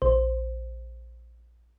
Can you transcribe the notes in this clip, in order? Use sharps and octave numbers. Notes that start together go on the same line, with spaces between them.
A#1 C5